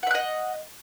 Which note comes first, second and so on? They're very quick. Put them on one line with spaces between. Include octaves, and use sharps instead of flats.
F#5 E5 F#6 D#5